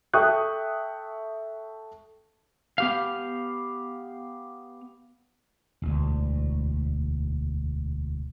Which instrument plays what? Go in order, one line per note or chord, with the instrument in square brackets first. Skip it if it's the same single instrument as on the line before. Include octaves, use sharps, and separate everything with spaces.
[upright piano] A4 E5 G5 C#6 D#6 F#6
[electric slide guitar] B3 G4 F5
[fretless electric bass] E1 D2